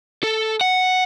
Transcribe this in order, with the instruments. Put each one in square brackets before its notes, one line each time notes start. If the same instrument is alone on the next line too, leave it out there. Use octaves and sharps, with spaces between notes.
[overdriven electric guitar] A4
F#5